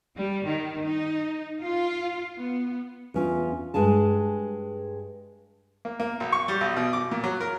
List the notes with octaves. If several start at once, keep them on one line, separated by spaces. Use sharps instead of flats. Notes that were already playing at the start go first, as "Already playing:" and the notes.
G3
D#3
D#4
F4
B3
E2 C#4 F4
G2 G#3 G#4 G#5 A5
A#3
A#3
B1
C#6
G3
B1
B2
D6
A#2
F#3
A#4